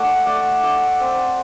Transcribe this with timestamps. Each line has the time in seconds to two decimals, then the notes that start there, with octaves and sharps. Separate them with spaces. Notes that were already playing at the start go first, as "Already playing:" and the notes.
Already playing: A3 D5 F#5
0.26 A3 D5 F#5
0.64 A3 D5 F#5
1.00 C4